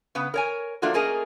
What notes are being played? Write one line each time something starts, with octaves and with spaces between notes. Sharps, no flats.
C#3 B3
A#4 C#5 G#5
F3 A3 A#3 D4 F4 F#4
A3 A#3 C#4 G#4 A#4 D#5